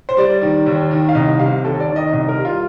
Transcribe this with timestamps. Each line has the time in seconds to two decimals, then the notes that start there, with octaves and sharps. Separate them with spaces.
0.09 C5
0.17 G3 D5
0.41 D#3
0.66 D#2
0.91 D#3
1.09 F5
1.15 C2 D#5
1.39 C3 F5
1.64 D#2 A4
1.80 D5
1.89 D#3
1.96 D#5
2.12 C2 D#5
2.28 A#4
2.38 G3
2.45 F4